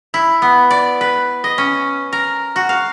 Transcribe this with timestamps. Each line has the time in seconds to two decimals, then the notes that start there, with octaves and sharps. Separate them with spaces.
0.14 E4
0.42 B3
0.70 D5
1.01 B4
1.44 D#5
1.58 C#4
2.13 A#4
2.56 F#4
2.69 F5